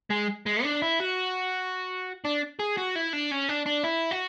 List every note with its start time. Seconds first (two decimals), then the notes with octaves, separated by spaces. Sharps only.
0.11 G#3
0.46 G#3
0.64 D4
0.82 E4
1.00 F#4
2.25 D4
2.59 G#4
2.77 F#4
2.95 E4
3.13 D4
3.31 C#4
3.49 D4
3.66 D4
3.84 E4
4.11 F#4